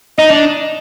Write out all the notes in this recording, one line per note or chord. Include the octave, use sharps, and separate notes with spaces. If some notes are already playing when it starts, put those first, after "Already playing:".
D#4 D#5
D4